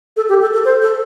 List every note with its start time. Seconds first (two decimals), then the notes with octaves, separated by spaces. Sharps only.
0.17 A4
0.29 G4
0.41 A4
0.53 A4
0.65 C5
0.82 A4